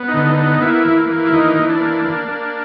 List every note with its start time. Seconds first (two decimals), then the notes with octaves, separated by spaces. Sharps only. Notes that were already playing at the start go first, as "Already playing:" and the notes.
Already playing: B3
0.08 D#4
0.14 D3
0.26 D#4
0.38 B3
0.43 D#4
0.61 A#3 E4
0.85 E3
1.09 A#3
1.27 E4
1.33 E3 D#4
1.57 E3
1.69 D4
1.81 A#3
2.05 A#3
2.28 A#3